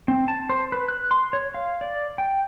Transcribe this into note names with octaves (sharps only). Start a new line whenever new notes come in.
C4
A5
C5
B4
F#6
C6
C#5
F5
D5
G5